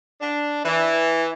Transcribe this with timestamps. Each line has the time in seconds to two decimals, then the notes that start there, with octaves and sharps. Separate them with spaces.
0.20 D4
0.65 E3